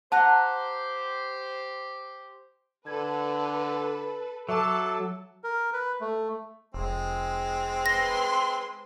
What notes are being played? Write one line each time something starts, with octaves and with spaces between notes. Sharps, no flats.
G4 C5 F#5 A5 A#5 F#6
D3 A4 B4 G#6
F#3 A4 E5 A5 D6 E6
A#4
B4
A3
F1 G#3 C4
B4 C6 A#6